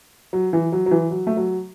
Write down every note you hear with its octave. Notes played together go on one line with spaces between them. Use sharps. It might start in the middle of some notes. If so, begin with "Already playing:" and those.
F#3
E3
F#3
F#3
E3
F#3
A3
F#3